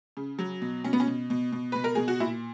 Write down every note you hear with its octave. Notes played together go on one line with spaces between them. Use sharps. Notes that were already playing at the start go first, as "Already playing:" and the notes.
C#3
F#3
B2
B2 C#4
B3
C#4
B2
B2
B2
B2 B4
A#4
B2 G#4
F#4
A#2 E4